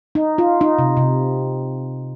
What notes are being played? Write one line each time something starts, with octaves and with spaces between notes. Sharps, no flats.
D#4
F4
D#4
C3
C3